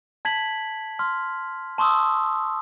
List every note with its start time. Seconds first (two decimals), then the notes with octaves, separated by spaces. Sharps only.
0.25 A5 G#6 B6 F#7
0.99 C6 F6
1.78 A5 C6 C#6 D#6 E6